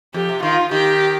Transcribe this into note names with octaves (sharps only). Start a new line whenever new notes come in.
F2 G4
C3
D#3 F4
D#3 G4